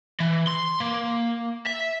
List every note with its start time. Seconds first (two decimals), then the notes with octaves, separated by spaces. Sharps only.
0.20 E3
0.47 C6
0.80 A#3
1.67 E5